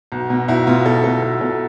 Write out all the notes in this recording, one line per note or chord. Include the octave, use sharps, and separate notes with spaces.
B1
B2
B1 E4
B2 F4
B1 A4
B2 A4
B1 A4
B2 A4